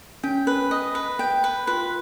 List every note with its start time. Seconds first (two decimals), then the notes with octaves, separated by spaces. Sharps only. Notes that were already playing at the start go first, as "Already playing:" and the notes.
0.23 C#4 G5
0.47 B4
0.71 D#5
0.95 B4
1.19 G5
1.44 B4
1.67 F4 B4